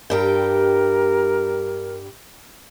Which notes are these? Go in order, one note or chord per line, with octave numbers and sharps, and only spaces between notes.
G2 G3 A#4 G5